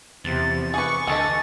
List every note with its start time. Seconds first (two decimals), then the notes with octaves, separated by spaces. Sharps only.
0.24 E2 C3 F3 A6
0.74 G#4 B4 C#6 D6
1.07 D2 G#4 A4 D#5 A6